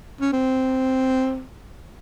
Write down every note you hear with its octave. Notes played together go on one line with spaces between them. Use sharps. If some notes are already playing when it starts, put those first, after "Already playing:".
C#4
C4